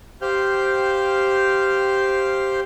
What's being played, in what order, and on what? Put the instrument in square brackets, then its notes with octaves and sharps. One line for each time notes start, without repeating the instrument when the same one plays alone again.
[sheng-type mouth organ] G4 C5 F5 G5 F6 G6